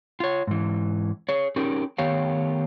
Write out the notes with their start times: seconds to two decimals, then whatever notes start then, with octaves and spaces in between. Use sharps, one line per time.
0.20 F4 C#5
0.47 G#2 E3
1.29 G#4 C#5
1.56 C#4 D#4 G4 G#4 A#4
1.98 D#3 A3 B3 G4 C#5 F5